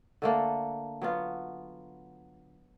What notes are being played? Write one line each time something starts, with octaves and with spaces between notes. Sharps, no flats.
D3 A3 A#3
F#3 B3 F4